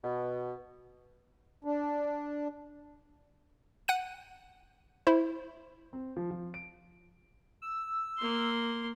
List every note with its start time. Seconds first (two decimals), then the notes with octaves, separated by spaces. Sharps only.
0.04 B2
1.64 D4
3.88 F#5 F#6 D#7
5.07 E4 C5
5.93 C4
6.17 F3
6.31 F3
6.54 D7
7.62 E6
8.18 A#3 C6